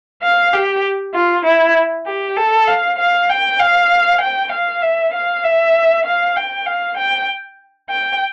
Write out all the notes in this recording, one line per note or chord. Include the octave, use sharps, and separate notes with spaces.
F5
G4
F4
E4
G4
A4
F5
F5
G5
F5
G5
F5
E5
F5
E5
F5
G5
F5
G5
G5